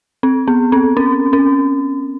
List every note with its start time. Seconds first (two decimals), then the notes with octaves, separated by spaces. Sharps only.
0.23 C4
0.48 B3
0.72 C4
0.97 C#4
1.33 C#4